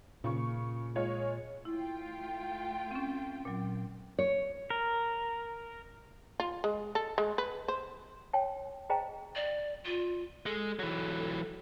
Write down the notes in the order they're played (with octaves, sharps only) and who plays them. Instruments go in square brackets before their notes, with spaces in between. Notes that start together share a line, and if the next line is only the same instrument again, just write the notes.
[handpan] A#2 [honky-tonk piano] C#3 C#6
[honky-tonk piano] G#3 F4 C#5
[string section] A3 F4 G5 [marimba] E4
[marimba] C4 C#4
A#2 F#3
[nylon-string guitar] C#5
[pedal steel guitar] A#4
[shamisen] F4
G#3
A4
G#3
B4
C5
[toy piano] C#5 G5 A5
G#4 C5 D#5 G5 A5 A#5
[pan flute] D5
F4
[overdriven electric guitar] G#3 [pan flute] A4
[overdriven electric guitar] E3 F#3